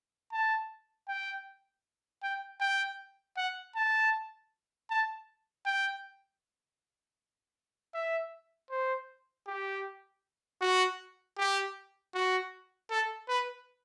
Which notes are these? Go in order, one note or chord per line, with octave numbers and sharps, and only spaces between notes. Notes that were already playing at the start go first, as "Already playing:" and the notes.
A5
G5
G5
G5
F#5
A5
A5
G5
E5
C5
G4
F#4
G4
F#4
A4
B4